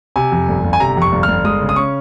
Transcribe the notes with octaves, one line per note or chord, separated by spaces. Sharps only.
C3 G#5
F2
G1
G1
G#5
C3 A#5
F2 C#6
G1
F6
G1
G#3 D#6
C#3
D#6
C#4 C#6